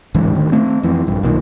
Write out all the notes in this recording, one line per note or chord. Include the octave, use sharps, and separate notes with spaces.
D1 C#2 G#2 E3
D2 D#3
A3 C4
F2 E3
A#1 G2
B1 A#2 D#3